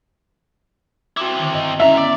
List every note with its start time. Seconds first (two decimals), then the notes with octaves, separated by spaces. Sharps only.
1.17 C4 E4 F#4 D6
1.39 D3 D#3
1.53 G2 D#5
1.80 G#3 C#4 E4 E5 A#5
1.97 B3 C#4 D5